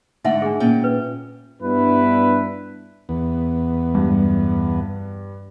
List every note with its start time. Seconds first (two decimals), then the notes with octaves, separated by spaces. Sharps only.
0.24 G#2 D3 A3 D#4 E5 F#5
0.42 D4 G#4
0.60 A#2 C#4 G5
0.84 B4
1.61 G2 B3 D4 E4 B4
3.09 E2 B3
3.95 G2